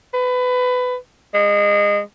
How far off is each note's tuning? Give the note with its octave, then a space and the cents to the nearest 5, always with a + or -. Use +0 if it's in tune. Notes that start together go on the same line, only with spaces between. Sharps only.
B4 +20
G#3 -25